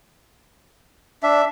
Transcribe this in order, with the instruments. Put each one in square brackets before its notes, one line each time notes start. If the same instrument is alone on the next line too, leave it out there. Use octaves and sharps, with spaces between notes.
[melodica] D4 [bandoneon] E5